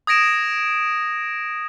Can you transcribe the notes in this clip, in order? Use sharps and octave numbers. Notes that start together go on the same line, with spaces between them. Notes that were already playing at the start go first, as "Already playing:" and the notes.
D#6 G#6 A#6 D7 E7